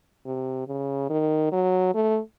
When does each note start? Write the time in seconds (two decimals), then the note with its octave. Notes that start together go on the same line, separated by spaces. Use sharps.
0.26 C3
0.67 C#3
1.10 D#3
1.52 F#3
1.94 A3